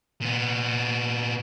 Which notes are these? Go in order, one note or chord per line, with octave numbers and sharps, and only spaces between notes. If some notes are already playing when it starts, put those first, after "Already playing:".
A#2 B3